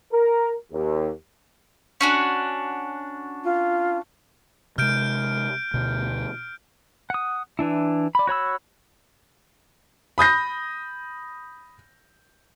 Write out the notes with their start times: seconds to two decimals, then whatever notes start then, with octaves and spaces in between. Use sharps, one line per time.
0.13 A#4
0.72 D#2
2.01 C#4 D4 F#4
3.44 F4
4.78 C3 G#3 F6 G6 D7
5.74 D2 B2
7.10 F#5 D#6
7.59 E3 D4 E4
8.15 D5 B5
8.27 F#4 C#5 B5 E6
10.18 B5 D#6 G6 A#6